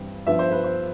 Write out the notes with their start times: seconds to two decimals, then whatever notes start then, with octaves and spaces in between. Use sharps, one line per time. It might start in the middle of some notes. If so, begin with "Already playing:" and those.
Already playing: G2 E3 G3 C4
0.27 G2 F3 B3 E5
0.39 C5
0.52 B4
0.64 C5